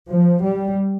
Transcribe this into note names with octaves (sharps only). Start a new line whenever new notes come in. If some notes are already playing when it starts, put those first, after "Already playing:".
F3
G3